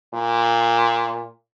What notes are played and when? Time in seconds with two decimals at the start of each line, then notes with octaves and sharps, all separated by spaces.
0.14 A#2